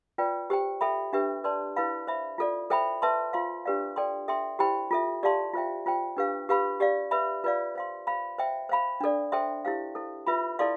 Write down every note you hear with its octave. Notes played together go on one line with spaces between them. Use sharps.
F4 B4 D5 G5
G4 C5 G5
A4 E5 G5 B5
D4 G4 B4 E5
B4 D5 A5 C6
E4 B4 F5 B5
C5 E5 B5
F4 A4 D5
A4 C5 E5 G5 B5
B4 E5 A5 C6
F4 C5 F5 C6
D4 G4 B4 D5 F5
A4 D5 G5 C6
A4 E5 G5 C6
E4 G4 C5 G5 B5
F4 A4 E5
G4 D5 F5 A5 C6
F4 C5 E5 G5
F4 C5 G5
D4 G4 B4 F5
G4 B4 F5 B5
G4 D5 F5
B4 E5 B5
F4 B4 D5 F5
C5 F5 C6
C5 F5 B5
C5 E5 G5
C5 F5 B5
D4 A4 D5
A4 C5 E5 G5 C6
E4 G4 C5 F5
E4 A4 C5
F4 B4 E5 B5
E4 A4 D5 F5 C6